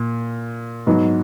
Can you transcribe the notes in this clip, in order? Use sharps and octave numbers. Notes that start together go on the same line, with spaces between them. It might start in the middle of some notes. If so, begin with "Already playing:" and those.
Already playing: A#2
G#2 F#3 B3